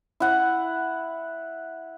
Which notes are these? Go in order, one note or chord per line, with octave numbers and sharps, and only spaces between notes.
E4 F#5